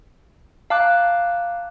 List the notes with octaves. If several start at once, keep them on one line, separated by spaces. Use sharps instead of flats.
F5 A5 A#5 D6 F#6